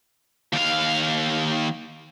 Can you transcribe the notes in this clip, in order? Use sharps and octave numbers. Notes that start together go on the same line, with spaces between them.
D#2 F5